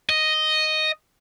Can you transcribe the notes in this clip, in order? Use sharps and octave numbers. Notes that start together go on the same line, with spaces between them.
D#5